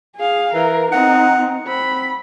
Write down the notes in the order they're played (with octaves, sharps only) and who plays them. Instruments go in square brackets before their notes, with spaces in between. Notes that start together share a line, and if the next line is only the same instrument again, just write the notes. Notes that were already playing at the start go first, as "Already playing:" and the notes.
[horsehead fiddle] G#4 F5
[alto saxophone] E3 [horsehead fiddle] A#4
[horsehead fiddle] C4 D#4 [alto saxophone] F#5
[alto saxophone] C4 [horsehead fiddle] B5